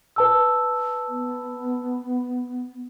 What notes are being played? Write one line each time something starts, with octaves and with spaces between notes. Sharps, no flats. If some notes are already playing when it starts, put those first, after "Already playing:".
B4 A5 E6
B3